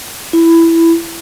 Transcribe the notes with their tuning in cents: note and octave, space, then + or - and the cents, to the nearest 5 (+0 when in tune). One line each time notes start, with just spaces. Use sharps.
E4 +10